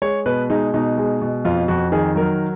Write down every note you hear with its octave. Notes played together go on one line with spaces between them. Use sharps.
G#3 C#5
B2 B4
G#3 D#4
B2 D#4
G#3
B2
F2 F4
F2 F#4
D#3 G#4
F#3 A#4